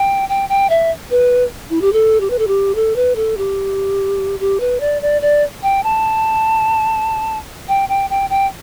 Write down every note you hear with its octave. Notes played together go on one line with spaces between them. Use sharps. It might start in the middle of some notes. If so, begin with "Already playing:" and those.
Already playing: G5
G5
G5
E5
B4
E4
G4
A4
G4
B4
A4
G4
A4
B4
A4
G4
G4
B4
D5
D5
D5
G5
A5
G5
G5
G5
G5